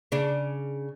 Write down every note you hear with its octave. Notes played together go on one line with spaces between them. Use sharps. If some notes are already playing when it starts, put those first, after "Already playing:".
C#3 D4